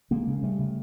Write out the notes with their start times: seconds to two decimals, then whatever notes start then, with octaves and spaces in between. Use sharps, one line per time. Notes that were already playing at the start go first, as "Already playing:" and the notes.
0.11 C#3 G#3 A#3
0.27 C#3
0.43 C#3 G3 A3
0.59 C#3